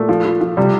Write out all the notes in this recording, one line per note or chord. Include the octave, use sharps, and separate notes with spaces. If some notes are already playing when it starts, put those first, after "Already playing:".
Already playing: A#2 A3
F3
F3
F3
C3 G3